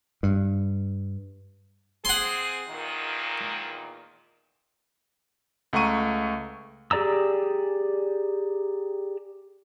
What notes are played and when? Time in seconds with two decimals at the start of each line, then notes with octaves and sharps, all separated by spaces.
0.23 G2
2.05 C4 G#4 F#5 C6
2.68 E2 A#2 D#3
5.73 C#2 A3 F#5 A#5 C#6 D#7
6.91 G4 G#4 D5 A#5 E6